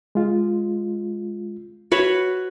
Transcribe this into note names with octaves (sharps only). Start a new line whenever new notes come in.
G#3 F4
F#4 B4 C#5